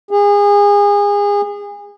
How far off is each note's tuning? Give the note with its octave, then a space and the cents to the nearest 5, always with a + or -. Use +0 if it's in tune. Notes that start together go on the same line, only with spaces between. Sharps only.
G#4 -30